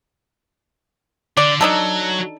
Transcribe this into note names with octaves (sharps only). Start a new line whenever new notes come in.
D3 D5
F#3 D4 D#4 A4